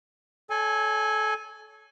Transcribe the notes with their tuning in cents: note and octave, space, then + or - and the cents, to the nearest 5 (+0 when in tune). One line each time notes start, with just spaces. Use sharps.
A4 -25 C#5 +25 G#5 +0